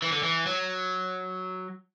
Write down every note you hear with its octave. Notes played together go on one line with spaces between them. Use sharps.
E3
D3
E3
F#3